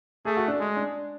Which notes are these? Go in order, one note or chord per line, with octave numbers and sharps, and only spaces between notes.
A3 G#4
F#4
D4
G#3
D4